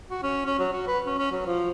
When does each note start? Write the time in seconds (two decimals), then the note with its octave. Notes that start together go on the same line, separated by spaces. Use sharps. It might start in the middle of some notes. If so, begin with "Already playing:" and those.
0.10 F#4
0.23 C#4
0.46 C#4
0.59 F#3
0.73 F#4
0.87 B4
1.07 C#4
1.18 C#4
1.32 F#3
1.46 F3